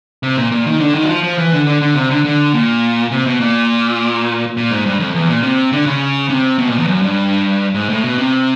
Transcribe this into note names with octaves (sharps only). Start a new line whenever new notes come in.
C3
A#2
A#2
D#3
D3
D#3
F#3
F3
F3
E3
D3
D3
D3
C3
D3
D3
A#2
C3
B2
A#2
A#2
G#2
G2
F2
E2
A#2
C3
D3
C#3
C3
B2
A#2
E2
F#2
G2
G#2
A2
B2
C3